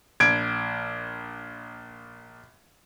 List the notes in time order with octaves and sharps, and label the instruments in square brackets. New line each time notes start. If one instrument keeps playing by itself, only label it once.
[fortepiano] A#1 [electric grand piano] G#6 D7